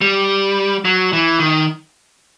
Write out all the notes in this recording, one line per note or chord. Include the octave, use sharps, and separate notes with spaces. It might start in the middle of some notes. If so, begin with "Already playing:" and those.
G3
F#3
E3
D#3